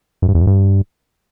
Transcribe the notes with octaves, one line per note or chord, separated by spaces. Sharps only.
F#2
G2
E2
F#2
G2